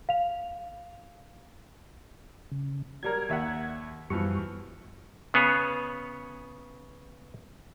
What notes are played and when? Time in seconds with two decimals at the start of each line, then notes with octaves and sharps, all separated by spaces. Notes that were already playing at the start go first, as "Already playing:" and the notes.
0.09 F5 F7
2.52 C#3
3.03 F#3 G3 A#4 G#6
3.29 D#2 E5 F#5
4.10 F#2 B2 E3 F3 G3 C#6
5.34 C#3 B3 G#4 C#5